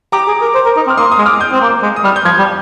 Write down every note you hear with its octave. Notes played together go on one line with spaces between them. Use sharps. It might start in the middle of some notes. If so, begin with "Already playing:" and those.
G4 A#5 D6
G#4
A#4
C5
A#4
D#4
C4
F6
A#3 C6 D#6
C6 D#6
G#3
D6 F6
D#6 G6
C4
A#3
G#3
D#6
G3 F6
G6
F3 F6 G#6
G3